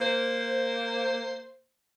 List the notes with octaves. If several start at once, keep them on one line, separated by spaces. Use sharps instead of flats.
A#3 C5